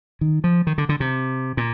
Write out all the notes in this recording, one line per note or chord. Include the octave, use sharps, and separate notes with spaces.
D#3
F3
D#3
D3
D3
C3
A#2